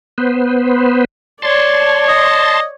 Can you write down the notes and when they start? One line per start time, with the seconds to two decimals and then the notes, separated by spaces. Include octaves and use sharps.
0.18 B3 B4 C5
1.42 C#5 D5 A5 C6
2.08 D#5